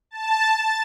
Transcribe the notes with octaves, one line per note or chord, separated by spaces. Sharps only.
A5
A6